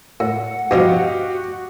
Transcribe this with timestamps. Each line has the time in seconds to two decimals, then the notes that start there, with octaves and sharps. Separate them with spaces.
0.20 A2 F#5
0.71 G2 B2 F3 F#4 G4 D#5 F5